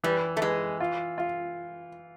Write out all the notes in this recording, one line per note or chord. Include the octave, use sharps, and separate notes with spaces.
E3 G3
A3
E3 G#3
F4
F4